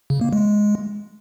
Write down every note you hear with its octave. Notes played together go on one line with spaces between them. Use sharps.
C#3
A#3
G#3